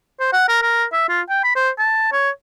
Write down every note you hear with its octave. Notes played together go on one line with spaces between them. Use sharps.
C5
F#5
A#4
A#4
E5
F4
G5
B5
C5
A5
C#5